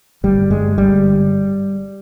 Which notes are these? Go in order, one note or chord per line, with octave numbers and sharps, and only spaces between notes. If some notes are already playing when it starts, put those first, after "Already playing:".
G1 G3
G2 G#3
G1 G3